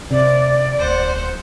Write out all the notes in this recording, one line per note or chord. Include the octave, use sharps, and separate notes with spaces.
C3 D5
D1 C5 F#5